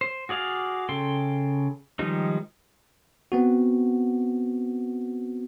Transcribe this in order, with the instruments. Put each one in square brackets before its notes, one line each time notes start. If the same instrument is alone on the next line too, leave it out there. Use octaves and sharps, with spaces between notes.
[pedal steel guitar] C5
F#4 G#4 D5 F5
C#3 A4 G5 C6
D#3 F3 G3 G#3 D#4
[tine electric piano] B3 C4 F#4